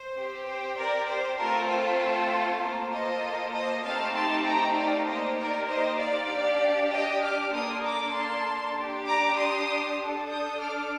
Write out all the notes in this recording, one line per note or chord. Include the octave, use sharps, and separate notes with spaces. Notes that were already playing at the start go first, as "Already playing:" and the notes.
Already playing: C5
C4 G4
C5
A#4 D5
C5
A3 C4 F4 A4 A#4
C5
A#3 F4 A4
C5 D#5
C5 D#5
A3 C4 D#4 G4 F5 A5
A5 C6
G5 A#5
D5 F5
A#3 D#4 G4 C5 D#5
A#4 D5
C5 D#5
D5 F5
D4 G4
D#5 G5
D6 F6
A#3 D4 A4 C6 D#6
A#5 D6
A5 C6
D4 G4
A#5 D6
C6 D#6
D4 A4
D#6 G6
D6 F6